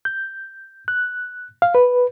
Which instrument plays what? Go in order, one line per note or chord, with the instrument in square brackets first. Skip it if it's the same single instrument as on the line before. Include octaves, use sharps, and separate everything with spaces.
[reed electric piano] G6
F#6
F5
B4